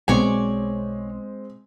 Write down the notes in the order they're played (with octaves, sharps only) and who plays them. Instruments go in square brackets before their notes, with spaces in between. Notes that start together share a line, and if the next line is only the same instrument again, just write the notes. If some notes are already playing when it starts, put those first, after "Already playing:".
[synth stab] B1 B2 [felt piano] G#3 C4 [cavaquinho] C#5 D5 G#5